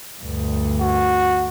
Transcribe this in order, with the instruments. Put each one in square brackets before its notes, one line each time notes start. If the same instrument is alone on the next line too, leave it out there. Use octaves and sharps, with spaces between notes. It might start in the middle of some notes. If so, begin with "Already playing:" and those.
[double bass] D2 G2
[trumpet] F#4